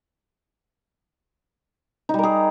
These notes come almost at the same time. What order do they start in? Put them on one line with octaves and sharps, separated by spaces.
D#4 G3 A#4 G#4